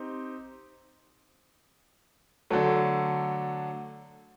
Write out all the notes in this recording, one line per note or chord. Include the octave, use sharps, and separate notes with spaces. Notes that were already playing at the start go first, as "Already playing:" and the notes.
Already playing: C4 D#4 G4
D3 F#3 A3